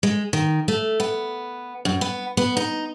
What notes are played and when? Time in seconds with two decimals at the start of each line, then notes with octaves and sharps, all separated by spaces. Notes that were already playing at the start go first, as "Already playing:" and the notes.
0.03 G#3
0.33 D#3
0.68 A3
1.00 B3
1.85 F#2
2.01 B3
2.37 B3
2.57 D#4